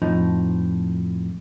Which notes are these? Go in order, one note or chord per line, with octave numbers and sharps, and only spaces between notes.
F2 A2 F3 D#4